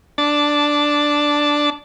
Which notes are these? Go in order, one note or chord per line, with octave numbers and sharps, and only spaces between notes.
D4 A5